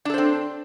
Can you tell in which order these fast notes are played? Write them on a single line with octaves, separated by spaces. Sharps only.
D4 A4 C5 C4